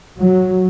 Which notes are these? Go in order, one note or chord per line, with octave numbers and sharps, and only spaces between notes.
F#3